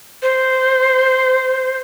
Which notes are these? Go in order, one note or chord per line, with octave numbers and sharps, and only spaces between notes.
C5